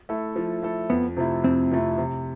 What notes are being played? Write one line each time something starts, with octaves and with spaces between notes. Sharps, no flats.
A3 E4 A4
F3
A3 E4 A4
F2 B3
C3 F3 A3 E4
F2 C4
C3 F3 A3 E4
C3